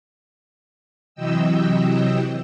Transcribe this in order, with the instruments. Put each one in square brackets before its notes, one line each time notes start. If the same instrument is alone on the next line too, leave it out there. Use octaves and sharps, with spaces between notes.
[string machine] C3 E3 F#3 D#5 G5 E6